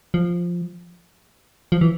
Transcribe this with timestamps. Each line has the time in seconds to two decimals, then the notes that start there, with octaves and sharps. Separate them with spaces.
0.14 F3
1.72 F3
1.81 E3